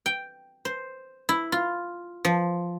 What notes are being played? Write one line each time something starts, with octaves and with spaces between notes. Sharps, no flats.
G5
C5
E4
F4
F3